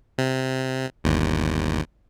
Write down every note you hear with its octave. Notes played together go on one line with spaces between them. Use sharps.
C3
G1 D#2